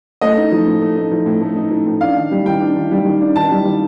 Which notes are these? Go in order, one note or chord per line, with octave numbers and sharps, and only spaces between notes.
A3 D#5
D#4
F3
A2
A3
D#4
F3
A2
A3
D#4
F3
A2
D4 F5
D#3
G3
D#3 G5
D4
D#3
G3
D#3
D4
D#3 A5
G3
D#3